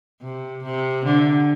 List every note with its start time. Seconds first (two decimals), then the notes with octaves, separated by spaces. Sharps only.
0.22 C3
0.63 C3
1.05 D3